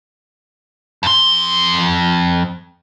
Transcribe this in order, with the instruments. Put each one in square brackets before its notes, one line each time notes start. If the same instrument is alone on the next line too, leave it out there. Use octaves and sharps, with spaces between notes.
[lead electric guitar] F2 C6